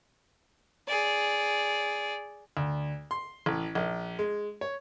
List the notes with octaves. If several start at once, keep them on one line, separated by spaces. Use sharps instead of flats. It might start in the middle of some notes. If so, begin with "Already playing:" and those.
G#4 D5
D2
C6
A1
A#1
G#3
C#5